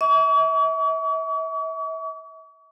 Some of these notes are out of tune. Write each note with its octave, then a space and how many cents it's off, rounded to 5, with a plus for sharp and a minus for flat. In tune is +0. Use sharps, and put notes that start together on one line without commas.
E5 -40 C#6 +45